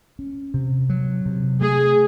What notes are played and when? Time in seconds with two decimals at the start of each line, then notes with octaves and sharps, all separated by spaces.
0.19 C#4
0.54 C3
0.90 F#3
1.26 C3
1.61 A3 G#4